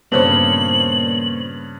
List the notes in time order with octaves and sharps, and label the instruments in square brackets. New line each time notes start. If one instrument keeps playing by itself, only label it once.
[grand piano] G2 C#3 [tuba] A#2 [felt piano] B3 C5 C#5 [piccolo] F#7